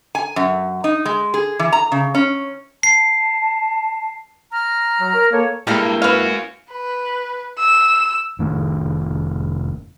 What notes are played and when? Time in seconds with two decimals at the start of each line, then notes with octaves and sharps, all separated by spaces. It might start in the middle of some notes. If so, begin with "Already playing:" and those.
0.15 G#5
0.36 F#2
0.84 D#4
1.05 G#3
1.34 G#4
1.59 E3
1.73 A#5
1.92 C#3
2.15 C#4
2.83 A5 C7
4.51 A#5 F6
5.01 F#3
5.14 A#4
5.31 A#3 A4 C#5
5.67 G2 G3 G#3 A#3 E4 A4 A#4
6.02 C#4 F#4 B4 F5
6.72 B4
7.59 E6
8.39 F1 D#3 A3